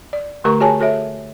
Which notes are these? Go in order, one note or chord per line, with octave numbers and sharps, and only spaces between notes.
D5
D3 A3 G4 A#4 A#5 C#6
F#4 G#4 C#5 G#5 A5
F#4 A4 C#5 E5